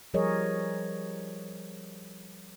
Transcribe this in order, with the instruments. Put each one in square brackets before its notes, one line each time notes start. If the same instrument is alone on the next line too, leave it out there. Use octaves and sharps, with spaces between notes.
[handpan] F3 G3 G#4 A#4 C#5 D#5